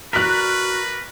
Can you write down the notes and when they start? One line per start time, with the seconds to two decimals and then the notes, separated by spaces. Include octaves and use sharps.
0.13 F#4 A#4 B4 D5 F#6 B6